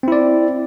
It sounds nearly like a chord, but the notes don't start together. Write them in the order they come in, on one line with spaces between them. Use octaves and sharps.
C4 E4 D5